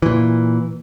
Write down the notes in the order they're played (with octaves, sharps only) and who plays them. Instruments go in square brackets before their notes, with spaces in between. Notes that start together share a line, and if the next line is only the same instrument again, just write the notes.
[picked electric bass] A#2 E3